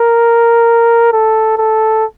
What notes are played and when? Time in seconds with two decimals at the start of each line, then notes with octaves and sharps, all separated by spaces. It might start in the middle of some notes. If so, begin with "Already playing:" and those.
Already playing: A#4
1.12 A4
1.57 A4